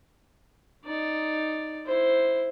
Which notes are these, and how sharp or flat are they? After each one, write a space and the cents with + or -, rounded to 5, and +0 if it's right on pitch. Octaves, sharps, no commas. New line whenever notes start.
D#4 +0 D5 +0
E4 +0 C5 +0